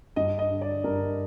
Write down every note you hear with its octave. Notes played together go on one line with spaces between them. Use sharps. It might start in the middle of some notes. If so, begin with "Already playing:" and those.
G2 D#5
D#5
D3
D5
G2 A#4